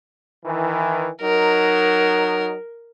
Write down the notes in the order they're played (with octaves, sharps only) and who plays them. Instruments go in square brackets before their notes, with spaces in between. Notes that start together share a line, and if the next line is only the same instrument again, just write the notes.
[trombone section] D#3 E3
[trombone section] F#3 D#4 [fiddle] A#4